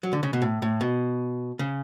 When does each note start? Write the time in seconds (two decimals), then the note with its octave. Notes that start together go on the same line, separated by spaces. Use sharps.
0.03 F#3
0.13 D3
0.23 C#3
0.33 B2
0.42 A2
0.62 A2
0.81 B2
1.59 C#3